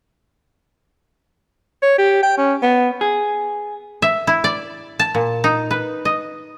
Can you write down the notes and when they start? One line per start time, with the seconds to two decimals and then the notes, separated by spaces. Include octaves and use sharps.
1.83 C#5
1.98 G4
2.23 G5
2.38 C#4
2.63 B3
3.01 G#4
4.02 E5
4.27 E4
4.44 D5
4.99 A5
5.15 A#2
5.44 D#4
5.71 B4
6.05 D#5